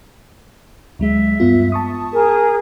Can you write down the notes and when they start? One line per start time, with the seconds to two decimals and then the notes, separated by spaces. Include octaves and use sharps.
0.99 D2 F#3 G#3 E5
1.40 G2 B3 F4
1.72 A5 C#6 D#6
2.12 G#4 A#4